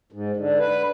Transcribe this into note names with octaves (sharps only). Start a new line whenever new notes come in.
G#2
D3
B4